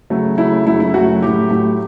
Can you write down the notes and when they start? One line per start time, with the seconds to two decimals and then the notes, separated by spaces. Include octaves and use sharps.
0.10 C#3 F#3 A3
0.38 C#3 F#3 A3 E4
0.66 F#2 C#3 F#3 A3 E4
0.80 E4
0.94 F#2 C#3 F#3 A3 F#4
1.22 A2 F#3 A3 G4
1.50 A2 F#3 A3